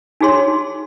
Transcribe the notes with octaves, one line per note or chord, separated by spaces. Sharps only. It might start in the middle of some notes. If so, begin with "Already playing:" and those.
D4 D#4 F#4 G#4 C#5 C6